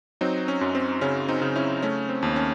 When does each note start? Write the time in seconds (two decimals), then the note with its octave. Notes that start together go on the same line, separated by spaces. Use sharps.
0.21 F#3 C4 D#4
0.48 C#4
0.61 F#2
0.75 C4
1.01 C#3 C#4
1.29 C4 D#4
1.42 C#3
1.56 C#4 E4
1.83 A3 C#4
2.09 C4
2.23 D#2
2.36 C#4